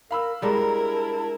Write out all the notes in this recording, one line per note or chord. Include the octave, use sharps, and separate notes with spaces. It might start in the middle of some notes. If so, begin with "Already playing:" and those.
A#4 F5 B5 E6
G3 G#3 D4 E4 A#4 A#5
A5